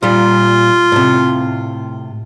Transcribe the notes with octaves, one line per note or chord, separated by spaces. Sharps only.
A#2 G3 F4
A2 C3